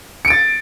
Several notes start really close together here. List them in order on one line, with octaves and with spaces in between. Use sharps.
C#7 D7 A6